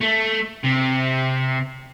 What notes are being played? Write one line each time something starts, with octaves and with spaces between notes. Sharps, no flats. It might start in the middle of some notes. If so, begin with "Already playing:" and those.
A3
C3